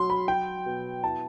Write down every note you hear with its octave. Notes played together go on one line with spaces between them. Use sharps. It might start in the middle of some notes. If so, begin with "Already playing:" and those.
Already playing: F#3 C6
B5
F#3 G5
B2
E4 A5